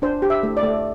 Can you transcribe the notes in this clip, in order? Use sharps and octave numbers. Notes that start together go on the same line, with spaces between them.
D4 C5
G4
E5
A3
D5
A3